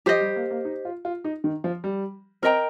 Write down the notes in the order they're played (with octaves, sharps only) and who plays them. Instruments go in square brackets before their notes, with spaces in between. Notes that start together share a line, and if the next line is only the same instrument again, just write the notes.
[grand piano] F3 [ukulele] G4 C5 D#5
[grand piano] G3
A#3
A#3
D#4
F4
F4
D#4
D#3
F3
G3
[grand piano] C4 [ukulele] A#4 D#5 G5 A#5